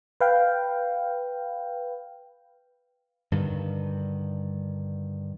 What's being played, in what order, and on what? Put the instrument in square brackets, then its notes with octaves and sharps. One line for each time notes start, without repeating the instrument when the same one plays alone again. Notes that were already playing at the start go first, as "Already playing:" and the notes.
[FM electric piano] B4 F5 G5
[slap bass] G2 D3 D#3